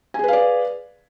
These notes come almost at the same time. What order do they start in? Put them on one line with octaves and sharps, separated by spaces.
G#5 G#4 B4 F5 D5